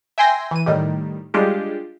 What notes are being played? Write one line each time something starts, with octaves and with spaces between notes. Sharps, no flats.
E5 G5 G#5 C6 G6 A#6
E3 D#7
A2 D#3 G3
G3 G#3 D4 F4 G4